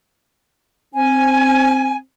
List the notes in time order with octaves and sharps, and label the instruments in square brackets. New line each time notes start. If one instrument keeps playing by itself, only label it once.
[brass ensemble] C4 [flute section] G#5